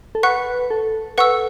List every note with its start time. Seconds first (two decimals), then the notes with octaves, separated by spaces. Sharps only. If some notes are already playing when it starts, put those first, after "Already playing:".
0.15 A4
0.23 B4 F#5 C#6 F#6
0.71 A4
1.18 B4 F#5 C#6 E6